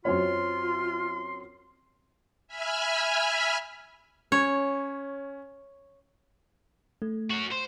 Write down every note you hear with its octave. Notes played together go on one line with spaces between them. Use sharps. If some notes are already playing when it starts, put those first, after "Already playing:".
F#2 C4 F4 C#5 C6
E5 G#5 B5 F6
C#4 C#5
A3
C#4 F#4
C5